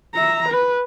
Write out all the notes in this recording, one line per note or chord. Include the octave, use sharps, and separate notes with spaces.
E5 A#5
B4